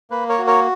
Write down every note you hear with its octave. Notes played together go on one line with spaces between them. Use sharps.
A#3 B4
A#4 C#5
F#4
A#4 C#5